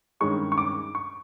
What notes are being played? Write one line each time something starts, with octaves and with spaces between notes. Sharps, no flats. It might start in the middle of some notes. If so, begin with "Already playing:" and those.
G2 D#3 G#3 C#4 C#6
C#6
D6
C#6